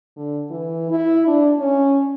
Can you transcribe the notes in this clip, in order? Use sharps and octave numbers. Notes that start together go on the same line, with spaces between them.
D3
E3
E4
D4
C#4